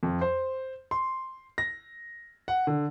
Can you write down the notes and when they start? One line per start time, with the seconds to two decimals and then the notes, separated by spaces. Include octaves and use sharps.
0.03 F2
0.21 C5
0.91 C6
1.58 A#6
2.48 F#5
2.67 D3